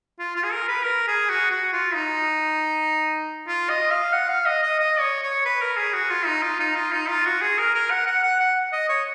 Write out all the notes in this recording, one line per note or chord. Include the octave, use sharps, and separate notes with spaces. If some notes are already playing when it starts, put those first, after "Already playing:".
F4
F4
G#4
A#4
B4
A#4
G#4
F#4
F#4
F4
D#4
F4
D#5
F5
F#5
F5
D#5
D#5
D#5
C#5
C#5
B4
A#4
G#4
F#4
F4
D#4
F4
D#4
F4
D#4
F4
F#4
G#4
A#4
A#4
F#5
F#5
F#5
F#5
D#5
C#5